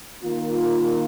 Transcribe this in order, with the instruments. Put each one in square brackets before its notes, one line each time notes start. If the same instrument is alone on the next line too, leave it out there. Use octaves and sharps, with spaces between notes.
[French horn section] D#3 A#3 F4